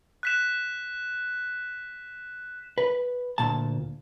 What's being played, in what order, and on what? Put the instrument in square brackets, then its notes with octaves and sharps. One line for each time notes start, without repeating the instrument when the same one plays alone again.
[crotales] F#6 B6 E7
[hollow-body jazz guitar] B4
D2 A#2 A5